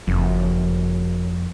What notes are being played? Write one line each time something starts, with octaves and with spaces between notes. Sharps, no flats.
F#1 F2